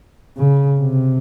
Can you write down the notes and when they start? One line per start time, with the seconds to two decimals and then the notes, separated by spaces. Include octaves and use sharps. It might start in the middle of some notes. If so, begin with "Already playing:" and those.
0.37 C#3
0.81 C3